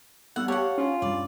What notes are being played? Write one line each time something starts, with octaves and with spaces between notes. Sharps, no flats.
G3 B3 F#5 E6
G4 C#5 F5 F#5 A5
C#4 F4
G2 D5